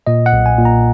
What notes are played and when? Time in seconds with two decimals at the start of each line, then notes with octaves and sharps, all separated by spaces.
0.07 A#2 D#5
0.26 F#5
0.33 B1
0.46 G#5
0.58 A#2
0.65 A#5